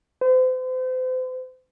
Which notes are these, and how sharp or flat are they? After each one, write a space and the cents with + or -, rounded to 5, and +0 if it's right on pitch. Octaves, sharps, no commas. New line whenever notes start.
C5 -40